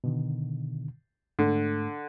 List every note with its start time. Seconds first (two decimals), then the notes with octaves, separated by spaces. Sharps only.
0.04 B2 D3 D#3
1.39 G#2 D3 A3